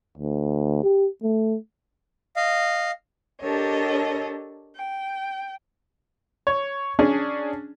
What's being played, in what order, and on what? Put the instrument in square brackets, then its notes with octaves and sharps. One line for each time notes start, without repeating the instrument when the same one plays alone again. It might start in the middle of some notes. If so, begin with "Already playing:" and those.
[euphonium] D2
G4
A3
[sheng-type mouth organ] D#5 F5
[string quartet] D4 G4 A4 A#4 C#5 D#5
G5
[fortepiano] C#5
C#4 D4 G#4